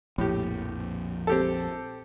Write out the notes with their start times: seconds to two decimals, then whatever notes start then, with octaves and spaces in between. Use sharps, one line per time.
0.18 A#1 F2 A2 G4
1.27 C4 G4 A4